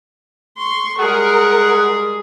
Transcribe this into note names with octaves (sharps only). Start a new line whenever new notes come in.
C6 C#6
G3 G#3 G#4 A#4 F#5